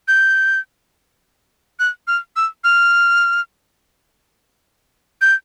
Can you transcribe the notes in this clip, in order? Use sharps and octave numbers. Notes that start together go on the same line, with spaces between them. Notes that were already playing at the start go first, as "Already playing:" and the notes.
G6
F#6
F6
E6
F6
G6